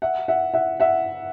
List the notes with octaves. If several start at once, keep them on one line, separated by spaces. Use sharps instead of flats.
E5 F#5
E5 F#5
E5 F#5
E5 F#5